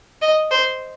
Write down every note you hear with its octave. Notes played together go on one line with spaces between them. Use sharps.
D#5
C5